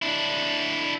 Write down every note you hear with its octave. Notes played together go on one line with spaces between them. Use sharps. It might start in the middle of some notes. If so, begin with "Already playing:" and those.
D4 E4